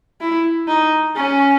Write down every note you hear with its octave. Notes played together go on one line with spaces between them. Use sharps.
E4
D#4
C#4